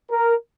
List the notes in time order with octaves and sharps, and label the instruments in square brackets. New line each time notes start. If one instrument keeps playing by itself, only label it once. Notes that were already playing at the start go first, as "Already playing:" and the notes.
[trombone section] A#4